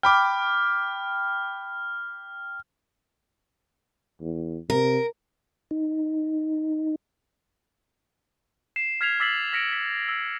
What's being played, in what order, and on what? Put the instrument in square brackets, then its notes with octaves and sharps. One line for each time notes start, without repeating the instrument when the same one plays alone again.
[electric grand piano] G5 B5 D6 [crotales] F6
[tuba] E2
[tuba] C3 [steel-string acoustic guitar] A#4
[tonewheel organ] D#4
[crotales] C7 E7
F6 G#6 B6 C7 F7
D6 E6 A6 B6 C7 F#7
F6 A#6 B6 C#7 D7
B6
E6